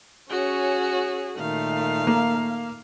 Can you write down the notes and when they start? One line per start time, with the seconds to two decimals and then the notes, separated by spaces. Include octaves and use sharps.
0.30 C#4 F#4 G#4 C#5 G#5
1.38 A#2 D#3 A3 F5
2.07 A#3